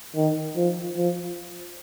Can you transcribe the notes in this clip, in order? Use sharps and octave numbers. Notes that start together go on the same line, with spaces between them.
D#3
F3
F3